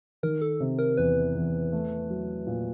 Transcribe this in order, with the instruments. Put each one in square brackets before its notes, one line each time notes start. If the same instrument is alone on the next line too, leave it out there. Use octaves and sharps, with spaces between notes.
[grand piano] D#3 [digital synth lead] A#4
[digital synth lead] A4
[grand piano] C3
[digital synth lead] A#4
[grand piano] E2 [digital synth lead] B4
[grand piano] E2
A3
F#3
A#2